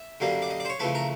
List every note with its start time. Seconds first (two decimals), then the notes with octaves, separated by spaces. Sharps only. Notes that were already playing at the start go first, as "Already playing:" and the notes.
Already playing: E5
0.20 F#2 D3 G3 A#3
0.42 D5
0.50 D#5
0.60 D5
0.65 C5
0.69 C#5
0.79 F2 C#3 E3 A3 B4
0.95 A#4